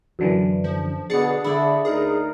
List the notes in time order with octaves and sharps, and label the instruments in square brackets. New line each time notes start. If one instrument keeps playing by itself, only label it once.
[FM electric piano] F#2 D3 E3
[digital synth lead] F3
[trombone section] B2 D3 B3 [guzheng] D4 [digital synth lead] G#4 [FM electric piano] A6 C#7
[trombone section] D3 [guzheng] E4 D5
[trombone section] D2 D#4 A#4 [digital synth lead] G#4